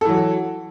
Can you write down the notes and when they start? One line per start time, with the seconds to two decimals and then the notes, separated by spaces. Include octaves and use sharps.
0.01 A4
0.05 E3
0.09 F#3